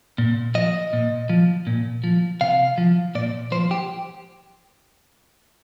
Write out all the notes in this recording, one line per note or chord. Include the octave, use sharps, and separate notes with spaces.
A#2
F3 D#5
A#2
F3
A#2
F3
C3 F5
F3
A#2 D5
F3 C5
G4